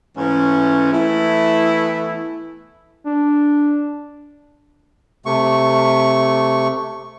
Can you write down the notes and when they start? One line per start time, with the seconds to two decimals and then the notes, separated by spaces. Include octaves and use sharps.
0.17 G#2 E3 A3 C#4
0.92 E3 A3 B3 E4
3.06 D4
5.26 C3 A3 C#6